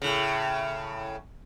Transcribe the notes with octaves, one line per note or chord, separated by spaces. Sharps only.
A2 C#3